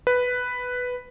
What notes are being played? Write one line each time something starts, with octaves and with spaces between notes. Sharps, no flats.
B4